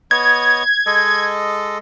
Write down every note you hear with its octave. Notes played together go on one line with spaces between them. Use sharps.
B3 C#5 D#5 G#6
G#3 A4 D#5